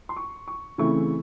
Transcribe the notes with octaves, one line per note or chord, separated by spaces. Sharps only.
C6
C#6
C#6
C#3 E3 A3 C4 E4 C#6